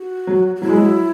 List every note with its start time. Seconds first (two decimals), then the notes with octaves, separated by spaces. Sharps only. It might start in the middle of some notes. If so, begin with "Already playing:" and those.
Already playing: F#4
0.27 F#3
0.56 F#4
0.62 F#3 E4
0.69 G#3
0.77 F#3